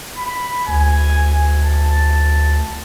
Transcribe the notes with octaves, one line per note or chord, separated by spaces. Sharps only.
B5
D2 G#5
A5